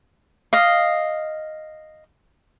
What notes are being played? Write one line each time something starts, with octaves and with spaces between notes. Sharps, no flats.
D#5 F5